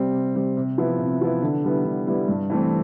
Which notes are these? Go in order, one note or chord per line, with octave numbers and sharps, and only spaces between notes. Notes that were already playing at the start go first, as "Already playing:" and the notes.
Already playing: C3 G3 C4
C3
G3 C4
C3
F3 B3 E4
C3
F3 B3 E4
D3
G3 B3 E4
D3
G3 B3 E4
G2
E3 A3 C4